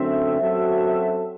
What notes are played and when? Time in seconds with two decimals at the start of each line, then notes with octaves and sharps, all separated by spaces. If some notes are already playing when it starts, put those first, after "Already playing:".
Already playing: F#2 D3 A3 C4 E5
0.40 F#2 F#3 C4 F#4 A4